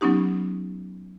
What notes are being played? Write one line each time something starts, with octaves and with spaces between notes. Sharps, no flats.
F#3 B3 C#4 D#4 G4